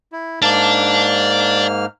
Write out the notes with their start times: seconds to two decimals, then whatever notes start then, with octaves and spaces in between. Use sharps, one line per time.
0.12 E4
0.42 G#2 A#3 D5 A5 F6